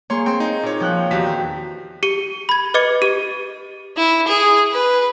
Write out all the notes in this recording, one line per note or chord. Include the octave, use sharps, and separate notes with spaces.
A#3 G#4 C#5 C6 C#6
C4 G5 C6
D#4
A#2 C#5
F3 G5 F#6
E2 D#3 F#4 G4 B6
G4 C#7 G7
B5 G#6
B4 D#5 D6 G#6 C#7
G4 D#7
E4
G#4
B4